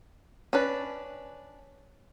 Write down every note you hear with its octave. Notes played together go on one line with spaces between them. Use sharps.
C#4 D4 B4